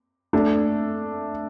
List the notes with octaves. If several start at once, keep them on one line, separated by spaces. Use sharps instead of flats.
A3 D4